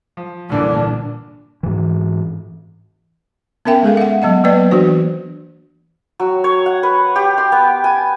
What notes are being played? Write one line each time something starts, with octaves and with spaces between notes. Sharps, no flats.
F3
C2 A#2 D3 E3 D4
G#2 E3
B3 C#4 A#4 E5 G5 G#5
G#3 G#4 A4 F5
E5 F#5
F#3 B3 D#5 F#5
F#3 A#3 B3 B4 D5
E3 D4 F#4 C5
F#3
C#5
F#5
B4
G4
C6
B3
G#5